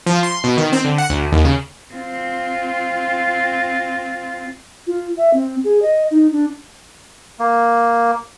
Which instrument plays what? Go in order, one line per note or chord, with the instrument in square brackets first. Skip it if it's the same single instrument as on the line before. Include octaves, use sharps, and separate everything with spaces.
[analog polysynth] F3
C6
B2
D#3
C4
D3
F#5
D2
D#2
C#3
[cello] C4 F4
[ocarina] F4
E5
C4
G#4
D#5
D#4
D4
[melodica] A#3